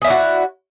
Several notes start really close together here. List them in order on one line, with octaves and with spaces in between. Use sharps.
G#4 E4 D5 F#4